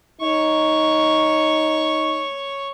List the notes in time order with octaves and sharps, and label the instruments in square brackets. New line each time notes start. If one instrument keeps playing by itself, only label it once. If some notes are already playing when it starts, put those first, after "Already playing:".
[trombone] D#4 [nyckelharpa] C#5 C#6